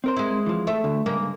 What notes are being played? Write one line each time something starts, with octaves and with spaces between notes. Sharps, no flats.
C4 A#4 C5
G#3 E4
E3 F3
A3 E5
D2 D3
G2 C#3 G#3 A#3